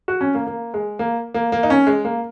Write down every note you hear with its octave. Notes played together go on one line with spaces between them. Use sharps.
F#4
C#4
A#3
A#3
G#3
A#3
A#3
A#3
D#4
C#4
G#3
A#3